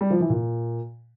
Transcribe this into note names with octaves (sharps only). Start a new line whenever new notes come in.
G3
F3
E3
A#2